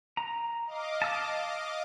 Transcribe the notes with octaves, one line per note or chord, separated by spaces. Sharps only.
A#5
D#5 F5 D6
A5 E6